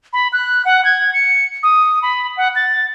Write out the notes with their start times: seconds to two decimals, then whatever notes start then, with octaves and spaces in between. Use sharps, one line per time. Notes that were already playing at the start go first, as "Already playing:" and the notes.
0.13 B5
0.33 F#6
0.65 F#5
0.85 G#6
1.13 C#7
1.63 D#6
2.02 B5
2.37 F#5
2.56 A6